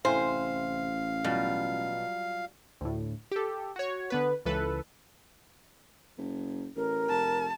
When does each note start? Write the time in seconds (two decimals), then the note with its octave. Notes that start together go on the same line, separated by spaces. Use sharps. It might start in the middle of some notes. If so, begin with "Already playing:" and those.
0.05 A1 C3 E4 C5 F5 G#5
1.24 B2 F#3 G3 F4
2.81 D2 A2
3.32 G4 A4
3.76 F#4 C#5
4.10 D3 B3 B4
4.46 C#2 E3 A4 B4
6.18 F#1
6.76 A1 A#4
7.09 F1 A5